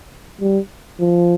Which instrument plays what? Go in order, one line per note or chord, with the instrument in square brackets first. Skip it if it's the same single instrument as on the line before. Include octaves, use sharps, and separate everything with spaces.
[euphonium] G3
F3